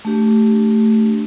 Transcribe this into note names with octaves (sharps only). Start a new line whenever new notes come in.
A3 D4 G4